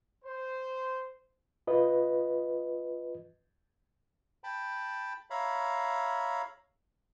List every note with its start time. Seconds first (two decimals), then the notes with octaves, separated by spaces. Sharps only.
0.25 C5
1.67 F4 B4 D#5
4.44 G5 A5 B5
5.30 C#5 E5 F5 A#5 B5